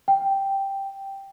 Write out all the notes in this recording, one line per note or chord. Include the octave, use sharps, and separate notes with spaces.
G5